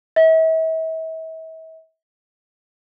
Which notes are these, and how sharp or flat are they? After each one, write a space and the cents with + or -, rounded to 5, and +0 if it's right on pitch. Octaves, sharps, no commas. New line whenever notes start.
E5 -40